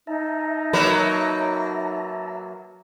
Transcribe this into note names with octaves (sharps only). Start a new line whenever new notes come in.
D#4 E5 A5 A#5
F#3 A#3 B4